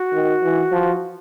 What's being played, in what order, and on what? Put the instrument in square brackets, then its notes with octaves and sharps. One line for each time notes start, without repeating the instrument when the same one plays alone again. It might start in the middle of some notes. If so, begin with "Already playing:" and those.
Already playing: [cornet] F#4
[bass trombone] D#3
E3
F3